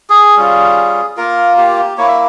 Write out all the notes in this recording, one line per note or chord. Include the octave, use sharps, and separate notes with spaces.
G#4
G3 C#4 F4
A#3 F4 A#4
G4
A#3 E4 C#5
E5